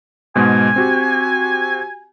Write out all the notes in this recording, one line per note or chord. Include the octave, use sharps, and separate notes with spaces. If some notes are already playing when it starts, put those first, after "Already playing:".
G#2 B2 G#3 G#5
C4 F#4 G4